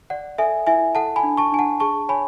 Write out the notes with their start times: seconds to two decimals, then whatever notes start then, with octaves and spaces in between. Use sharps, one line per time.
0.10 D5 F#5
0.38 A4 E5 G#5
0.67 E4 E5 G#5
0.95 A4 F#5 A5
1.16 G#5 B5
1.23 D4
1.37 A5 C#6
1.52 D4 G#5
1.59 F#5 A5
1.80 G#4 A5 C#6
2.09 C#5 G#5 B5